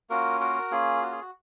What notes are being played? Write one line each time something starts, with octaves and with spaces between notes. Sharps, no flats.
A#3 C#4 F4 F#4 A#4
F#4 A#4
A#3 C#4 F4 G#4
F#4
G#4
F#4